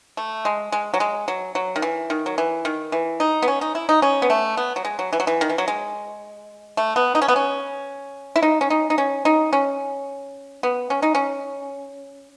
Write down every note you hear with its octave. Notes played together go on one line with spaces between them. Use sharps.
A3
G#3
G#3
F#3
G#3
F#3
F#3
D#3
E3
D#3
F#3
E3
D#3
E3
D#4
B3
C#4
D#4
E4
D#4
C#4
B3
A3
B3
F#3
G#3
F#3
E3
F#3
E3
D#3
E3
F#3
G#3
A3
B3
D#4
C#4
B3
C#4
E4
D#4
C#4
D#4
D#4
C#4
D#4
C#4
B3
C#4
D#4
C#4